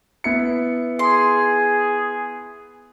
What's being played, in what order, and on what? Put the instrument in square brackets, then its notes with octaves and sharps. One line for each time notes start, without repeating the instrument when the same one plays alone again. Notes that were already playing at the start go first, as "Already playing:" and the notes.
[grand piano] B3 E4 C#7
[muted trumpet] G#4 [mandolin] C6